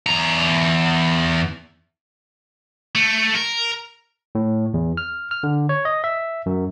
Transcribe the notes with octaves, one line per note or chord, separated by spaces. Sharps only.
E2 A#5
A3
A#4
A2
E2
F6
F6
D3
C#5
D#5
E5
F#2